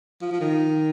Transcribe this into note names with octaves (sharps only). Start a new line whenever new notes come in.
F3
F3
D#3